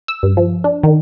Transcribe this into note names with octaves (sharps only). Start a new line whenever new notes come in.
E6
G2
F3
D4
D#3